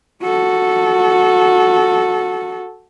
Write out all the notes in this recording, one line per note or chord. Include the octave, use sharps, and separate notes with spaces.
F#4 A4